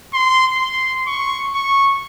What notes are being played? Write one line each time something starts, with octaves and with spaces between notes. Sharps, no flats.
C6
C6
C#6
C#6